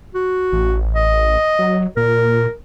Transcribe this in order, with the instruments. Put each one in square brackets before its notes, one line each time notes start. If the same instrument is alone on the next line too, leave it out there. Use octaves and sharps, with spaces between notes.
[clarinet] F#4
[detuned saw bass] A1
[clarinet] D#5
[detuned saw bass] F#3
[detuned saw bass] A#2 [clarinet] A#4